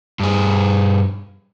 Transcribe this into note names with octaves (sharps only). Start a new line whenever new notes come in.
G2 G#4